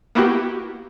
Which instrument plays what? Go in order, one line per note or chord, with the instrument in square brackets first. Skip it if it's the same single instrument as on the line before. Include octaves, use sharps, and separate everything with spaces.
[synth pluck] A#3 B3 E4 F#4 G4